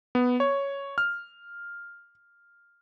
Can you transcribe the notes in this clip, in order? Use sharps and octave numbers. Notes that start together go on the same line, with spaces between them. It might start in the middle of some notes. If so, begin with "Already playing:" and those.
B3
C#5
F6